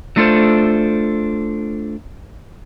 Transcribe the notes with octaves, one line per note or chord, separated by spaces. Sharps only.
F#3 A3 D4 F4 A4 C5